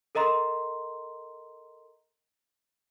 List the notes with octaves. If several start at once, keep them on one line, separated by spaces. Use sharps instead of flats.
A4 A#4 D#5 A#5 C6